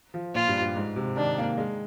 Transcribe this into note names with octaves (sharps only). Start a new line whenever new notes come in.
F3
A#2 F4
G2
G2
G#2
C3
D#3 D4
A#3
G#3